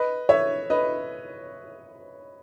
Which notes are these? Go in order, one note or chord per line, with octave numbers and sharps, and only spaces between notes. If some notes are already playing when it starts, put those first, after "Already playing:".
Already playing: B4 D#5
C#5 E5
B4 D#5